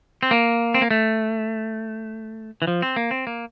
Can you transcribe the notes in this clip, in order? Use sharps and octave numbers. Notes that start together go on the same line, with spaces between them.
C4
A#3
C4
A#3
A3
E3
F3
C4
A#3
C4
A#3